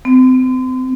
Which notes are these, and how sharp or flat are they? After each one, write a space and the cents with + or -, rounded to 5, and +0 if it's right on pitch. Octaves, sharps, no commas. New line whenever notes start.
C4 -35